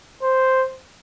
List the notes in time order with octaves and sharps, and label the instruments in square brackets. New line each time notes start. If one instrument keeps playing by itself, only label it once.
[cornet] C5